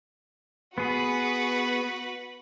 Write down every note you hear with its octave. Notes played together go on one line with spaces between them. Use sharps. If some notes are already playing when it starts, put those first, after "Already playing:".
B3 F#4 G#4 B4